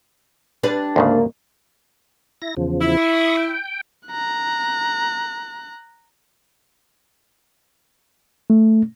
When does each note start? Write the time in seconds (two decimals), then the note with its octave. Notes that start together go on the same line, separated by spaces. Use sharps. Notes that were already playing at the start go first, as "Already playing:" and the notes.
0.63 G3 D4 B4
0.96 D2 G#2 C#3 A#3
2.42 E4 A#6
2.57 E2 C#3 F3
2.81 E4
2.97 B5 C#6 D#6
3.37 G5
4.07 A#5 F#6
8.50 A3